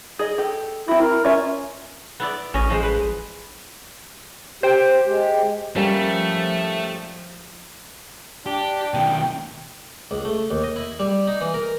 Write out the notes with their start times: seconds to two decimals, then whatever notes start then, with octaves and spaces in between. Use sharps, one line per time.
0.19 G#4 D#5
0.38 G4 A4
0.88 C4 E4 F#4
1.01 A#4
1.25 C#4 F4 C#5 E5
2.20 B3 E4 D5
2.54 A1 C#4 D#5
2.70 F3 G#3 C5
2.83 B4
4.63 G4 C5 G5
5.05 G#3 G4
5.76 F3 G3 A3 A#3 C#4
8.46 D4 G4
8.94 B2 D#3 G5
10.11 C#2
10.25 A3
10.50 D#2
10.64 D#5
10.76 E4
10.99 G3
11.27 D#4
11.41 E3
11.54 A#4